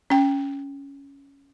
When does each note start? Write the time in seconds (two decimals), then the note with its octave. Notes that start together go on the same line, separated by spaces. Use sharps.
0.10 C#4 G5